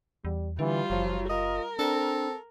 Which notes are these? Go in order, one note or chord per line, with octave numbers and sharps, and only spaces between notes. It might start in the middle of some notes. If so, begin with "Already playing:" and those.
E2 G3
D3 E3 G3 F4
F#1 F3 F#3
F4 A#4 D#5
C4 D4 A4